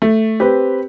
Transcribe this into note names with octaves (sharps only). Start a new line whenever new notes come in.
A3
C4 G4 B4